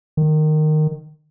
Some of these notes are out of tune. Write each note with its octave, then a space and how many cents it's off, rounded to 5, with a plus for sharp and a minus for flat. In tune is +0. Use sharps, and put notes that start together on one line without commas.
D#3 -15